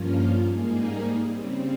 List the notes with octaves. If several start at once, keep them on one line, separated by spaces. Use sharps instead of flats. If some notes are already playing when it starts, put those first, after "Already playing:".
Already playing: G2 F3 A#3 C#4 F4
G#2 G3 A#3 D#4 G#4
C#3 G3 C4